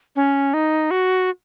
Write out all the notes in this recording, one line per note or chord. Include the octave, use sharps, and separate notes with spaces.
C#4
D#4
F#4